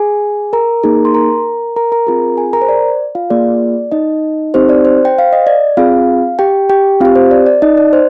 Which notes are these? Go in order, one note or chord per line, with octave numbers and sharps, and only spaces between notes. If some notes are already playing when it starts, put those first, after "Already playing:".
Already playing: G#4 G#5
A#4 A#5
A#3 D#4 G#4
C6
A#4 A#5
A#4 A#5
A#4 A#5
C4 F4 G#4
G#4 G#5
A#4 A#5
C5
D5
F4 F5
A#3 F4 G#4 D5
D#4 D#5
C4 D#4 G4 C5
D5
C5
G5
F5
D#5
D5
C4 F4 G#4 F5
G4 G5
G4 G5
C4 F4 G4 F5
C5
D5
D5
D#4 D#5
D5
C5